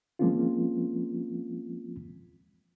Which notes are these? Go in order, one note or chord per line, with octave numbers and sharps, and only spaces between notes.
F3 G#3 A#3 C4 C#4 F4